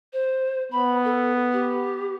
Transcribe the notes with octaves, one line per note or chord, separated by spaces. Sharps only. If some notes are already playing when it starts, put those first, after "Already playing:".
C5
B3 B5
A4
G4